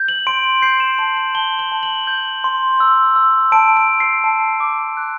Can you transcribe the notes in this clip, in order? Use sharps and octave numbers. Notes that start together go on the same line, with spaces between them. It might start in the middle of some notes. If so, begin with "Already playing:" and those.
Already playing: G6
F#7
C6 D7
G6 C7
E7
A5 F#7
F#7
A5 G7
F#7
A5
F#7
G6
C6
E6
E6
A5 D7
D7
A5
C7
A5
D6
F#6